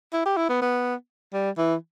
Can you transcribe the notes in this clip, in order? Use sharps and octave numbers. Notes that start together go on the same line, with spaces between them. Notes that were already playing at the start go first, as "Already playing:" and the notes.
E4
G4
E4
B3
B3
G3
E3